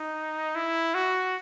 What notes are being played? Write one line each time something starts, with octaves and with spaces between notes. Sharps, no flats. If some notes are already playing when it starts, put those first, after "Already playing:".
Already playing: D#4
E4
F#4